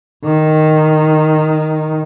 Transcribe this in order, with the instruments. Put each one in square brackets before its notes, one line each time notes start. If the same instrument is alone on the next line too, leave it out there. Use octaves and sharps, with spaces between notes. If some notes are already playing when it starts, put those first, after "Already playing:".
[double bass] D#3